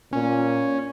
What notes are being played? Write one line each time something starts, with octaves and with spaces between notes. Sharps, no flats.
A#2 C#4